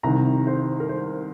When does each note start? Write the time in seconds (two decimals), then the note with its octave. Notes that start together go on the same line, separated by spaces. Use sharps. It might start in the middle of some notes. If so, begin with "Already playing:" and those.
0.03 C2 C3 D#3 A#5
0.47 C5
0.80 A#4
0.89 C5